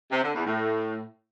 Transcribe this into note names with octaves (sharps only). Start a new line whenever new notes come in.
C3
D3
E2
A2